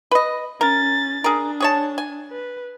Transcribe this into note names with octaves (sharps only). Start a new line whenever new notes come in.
B4 D#5
C#4 A#4 A6
D4 G#4 A#4
G#4 C#5 A5
G#5
B4